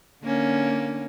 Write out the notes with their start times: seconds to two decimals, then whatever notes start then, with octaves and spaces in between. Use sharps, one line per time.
0.23 D3 A#3 C#4